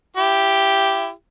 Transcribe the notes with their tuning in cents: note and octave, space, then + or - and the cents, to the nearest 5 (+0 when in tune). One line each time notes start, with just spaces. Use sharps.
E4 +25 G4 +0